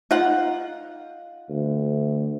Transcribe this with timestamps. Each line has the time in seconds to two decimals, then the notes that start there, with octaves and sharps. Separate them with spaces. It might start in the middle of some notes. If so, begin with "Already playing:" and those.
0.11 D#4 F4 F#5
1.49 D2